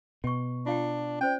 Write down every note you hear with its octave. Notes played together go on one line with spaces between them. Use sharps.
B2 G5 C#6
D4 F4 F5 G5
C#4 C5 D5 G5